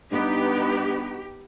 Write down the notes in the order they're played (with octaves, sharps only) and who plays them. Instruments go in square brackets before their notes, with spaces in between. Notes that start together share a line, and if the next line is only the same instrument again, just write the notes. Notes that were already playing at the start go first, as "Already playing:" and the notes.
[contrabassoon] G2 [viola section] B3 D#4 B4 [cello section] G4